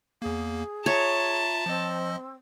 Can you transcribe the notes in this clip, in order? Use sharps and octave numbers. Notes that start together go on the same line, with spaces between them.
E2 A#3 G#4
F4 C#5 E5 A5 A#5
F3 C4 D#5